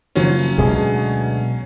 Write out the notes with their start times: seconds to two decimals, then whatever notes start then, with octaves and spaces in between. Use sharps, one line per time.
0.15 F#1 F3 F#3 C#4
0.58 D2 B2 G#3 G#4